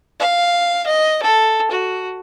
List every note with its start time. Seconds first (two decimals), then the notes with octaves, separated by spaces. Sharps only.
0.20 F5
0.87 D#5
1.23 A4
1.71 F#4